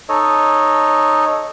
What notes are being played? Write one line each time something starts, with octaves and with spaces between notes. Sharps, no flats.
D#4 A4 C#5 D#5